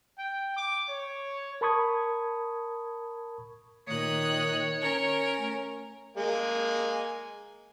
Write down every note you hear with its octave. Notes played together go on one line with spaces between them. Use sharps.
G5
D6
C#5
A#4 A5 B5 C#6 D#6 G#6
A#2 D#3 C#5 D#6 F#6
C#4 A#4
A3
G#3 A#3 G#5